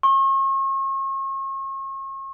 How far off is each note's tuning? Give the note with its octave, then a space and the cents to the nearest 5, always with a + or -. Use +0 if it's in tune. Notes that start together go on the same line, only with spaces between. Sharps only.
C#6 -40